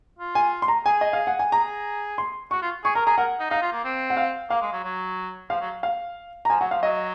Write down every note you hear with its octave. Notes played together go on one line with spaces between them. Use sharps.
F4
G#5
C6
A#5
G#4 G#5
D#5
F5
F#5
G#5
G#4 A#5
C6
F#4 C#6
F4
G#4 C#6
A#4 A#5
G#4 A#5
A#4 F#5
D#4
D#4 F5
F4
A#3
C4
F#5
F5
A#3 F5
G#3
F#3
F#3
F3 F5
F#3
F5
A#5
F3 G#5
F#3 F#5
F3 F5
F#3 D#5